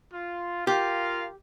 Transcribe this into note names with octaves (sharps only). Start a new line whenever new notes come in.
F4
F4 G4 A#4 F5